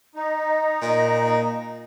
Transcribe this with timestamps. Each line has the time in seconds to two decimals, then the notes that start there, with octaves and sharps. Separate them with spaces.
0.15 D#4 D#5
0.82 A#2